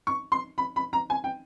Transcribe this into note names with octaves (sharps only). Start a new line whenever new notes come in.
C#6
C6
B5
B5
A#5
G#5
G5